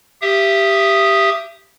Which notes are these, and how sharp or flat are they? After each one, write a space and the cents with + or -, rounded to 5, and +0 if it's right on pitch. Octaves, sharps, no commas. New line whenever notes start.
G4 +0 E5 +30 D#6 +0